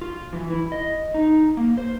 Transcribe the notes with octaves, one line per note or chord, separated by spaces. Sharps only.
F4
E3
E4
D#5
D#4
A#3
C5